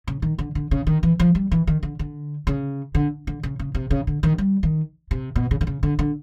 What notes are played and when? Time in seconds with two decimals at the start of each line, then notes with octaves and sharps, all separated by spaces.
0.07 C#3
0.22 D#3
0.39 D3
0.55 D3
0.71 C#3
0.87 D#3
1.03 E3
1.20 F3
1.35 G3
1.51 E3
1.67 D#3
1.83 D3
1.99 D3
2.47 C#3
2.95 D3
3.27 D3
3.43 C#3
3.59 C#3
3.75 C3
3.91 C#3
4.07 D3
4.23 D#3
4.38 G3
4.63 D#3
5.11 C3
5.36 B2
5.51 C#3
5.61 D3
5.67 C#3
5.83 D3
5.99 D3